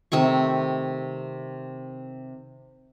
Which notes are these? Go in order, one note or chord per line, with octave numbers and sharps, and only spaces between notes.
C3 D#3 A3 C#6